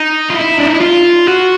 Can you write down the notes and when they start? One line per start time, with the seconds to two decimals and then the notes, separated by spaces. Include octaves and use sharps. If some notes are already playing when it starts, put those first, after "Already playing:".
Already playing: D#4
0.30 F4
0.36 E4
0.58 D4
0.67 D#4
0.73 E4
0.81 F4
1.27 F#4